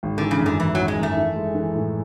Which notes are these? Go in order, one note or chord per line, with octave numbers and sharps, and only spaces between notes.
G#1
D3 E3
C#3
F#2
D3
F#2 E3
G#1 F#3
G#3
F#2 A3
E3
G#3
E3
A2